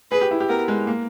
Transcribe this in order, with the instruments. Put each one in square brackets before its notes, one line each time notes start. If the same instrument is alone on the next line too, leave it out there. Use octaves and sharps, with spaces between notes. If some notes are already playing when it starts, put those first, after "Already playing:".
[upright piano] G#4 [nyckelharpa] B4
[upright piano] G4
E4
G4
[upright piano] B3 [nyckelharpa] A#4
[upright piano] G#3
A#3